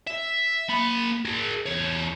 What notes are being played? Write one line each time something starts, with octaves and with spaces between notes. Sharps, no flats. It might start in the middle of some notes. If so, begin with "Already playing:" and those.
E5
A#3 B5
G#4 A#4
E2 C#5